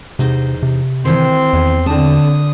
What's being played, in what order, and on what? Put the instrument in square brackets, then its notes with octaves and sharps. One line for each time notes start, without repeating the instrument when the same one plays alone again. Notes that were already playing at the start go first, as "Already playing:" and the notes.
[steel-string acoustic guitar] E2 D#4 C5 [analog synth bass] C3
[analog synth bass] C3
[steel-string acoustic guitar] D#3 E3 G5 [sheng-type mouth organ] C4 C6
[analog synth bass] E2
[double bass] D3 [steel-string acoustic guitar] C4 A5 [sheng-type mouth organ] D#6